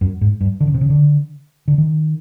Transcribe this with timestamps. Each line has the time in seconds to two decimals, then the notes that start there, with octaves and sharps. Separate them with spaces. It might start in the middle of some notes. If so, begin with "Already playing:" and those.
0.01 F#2
0.21 G#2
0.41 G2
0.61 D3
0.67 C#3
0.74 C3
0.81 C#3
0.90 D3
1.68 D3
1.78 D#3